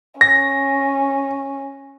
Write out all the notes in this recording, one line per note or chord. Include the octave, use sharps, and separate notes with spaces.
C#4 A#6